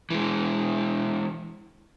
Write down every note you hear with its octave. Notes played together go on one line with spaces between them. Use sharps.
E3 G#3